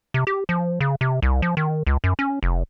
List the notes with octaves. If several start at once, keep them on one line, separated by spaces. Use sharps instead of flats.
C3
G4
F3
C#3
C3
C2
F3
D#3
C#2
F#2
C#4
F1